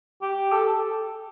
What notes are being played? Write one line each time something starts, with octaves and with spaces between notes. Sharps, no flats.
G4
A4